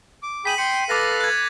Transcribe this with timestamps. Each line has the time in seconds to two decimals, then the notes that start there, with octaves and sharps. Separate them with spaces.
0.23 D6
0.45 G#4 G5 B5 B6 D#7 F#7
0.58 G5 C6 C#7
0.89 A4 B4 F5 D6 A6 A#6
1.20 F#6 G#6